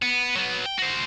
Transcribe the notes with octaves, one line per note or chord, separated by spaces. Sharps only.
B3
F#3 B3
G5
F#4 C5